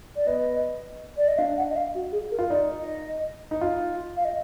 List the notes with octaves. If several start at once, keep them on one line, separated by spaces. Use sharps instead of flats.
D5
B3 D#5
D5
D#5
D4 F5
F#5
D#5
F5
F#4
G#4
A#4
F4
D#4 D5
D#5
D#4
F4
F5
D#5